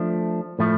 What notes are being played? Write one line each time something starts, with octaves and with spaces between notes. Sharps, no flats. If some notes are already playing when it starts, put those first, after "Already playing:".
Already playing: F3 A3 D4
A2 F3 A3